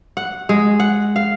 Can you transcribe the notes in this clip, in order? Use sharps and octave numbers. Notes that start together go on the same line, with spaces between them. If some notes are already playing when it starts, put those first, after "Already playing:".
F#5
G#3
F#5
F5